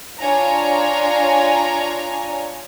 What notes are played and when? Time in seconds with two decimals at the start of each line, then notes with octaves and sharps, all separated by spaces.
0.19 D4 F4 C#5 G#5 A#5